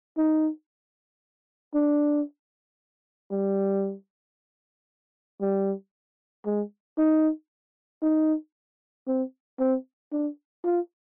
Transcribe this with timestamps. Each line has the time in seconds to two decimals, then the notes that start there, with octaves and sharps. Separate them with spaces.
0.18 D#4
1.74 D4
3.31 G3
5.41 G3
6.46 G#3
6.98 D#4
8.03 D#4
9.07 C4
9.59 C4
10.12 D4
10.64 F4